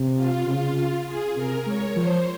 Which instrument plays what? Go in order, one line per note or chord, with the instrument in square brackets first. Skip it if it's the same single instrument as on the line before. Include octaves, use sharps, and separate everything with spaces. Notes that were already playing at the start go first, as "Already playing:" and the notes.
Already playing: [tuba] C3
[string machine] F4
[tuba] C#3 [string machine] F4
[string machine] G#4
[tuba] C3 [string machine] A#4
[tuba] G#3 [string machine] C#5
[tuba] F3 [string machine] C5